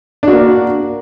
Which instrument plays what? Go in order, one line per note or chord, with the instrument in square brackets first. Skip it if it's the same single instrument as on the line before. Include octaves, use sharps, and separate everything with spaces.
[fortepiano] D4
F#4
A#3